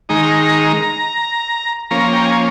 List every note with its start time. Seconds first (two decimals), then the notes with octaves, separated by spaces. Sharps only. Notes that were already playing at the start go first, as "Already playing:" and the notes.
0.09 D#3 G#3 D#4 A#5
1.90 F3 A#3 C#4 A#5
2.13 G5
2.25 G#5